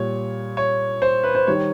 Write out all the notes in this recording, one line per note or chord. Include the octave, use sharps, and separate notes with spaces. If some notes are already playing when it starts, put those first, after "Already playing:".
Already playing: A#2 G3 C#5
C#5
C5
B4
C5
D#3 G3 C#5